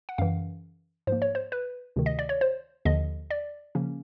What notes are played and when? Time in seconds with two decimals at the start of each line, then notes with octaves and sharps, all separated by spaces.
0.09 F#5
0.18 F#2 C#3 E3 F5
1.07 G#2 F3 A#3 C5
1.22 C#5
1.35 C5
1.52 B4
1.96 D2 C3 D#3
2.06 D#5
2.19 D5
2.29 C#5
2.41 C5
2.85 D#2 D3 F3 D#5
3.31 D5
3.75 C#3 F3 A#3 C#4